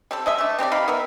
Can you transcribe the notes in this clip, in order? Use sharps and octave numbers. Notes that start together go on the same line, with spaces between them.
G3 C4 A4
G#3 D#5 E5
A3 D4
C4 G4 B4 D5
C3 D#4 F5 B5
B3 A#4 E5